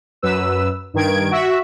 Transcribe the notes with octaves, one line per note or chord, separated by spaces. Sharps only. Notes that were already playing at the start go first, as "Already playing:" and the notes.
F#2 B4 E6
G2 D#3 G#6 D7
F#4 E5